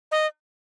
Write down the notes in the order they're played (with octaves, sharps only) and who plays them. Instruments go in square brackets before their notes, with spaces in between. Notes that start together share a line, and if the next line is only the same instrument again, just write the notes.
[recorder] D#5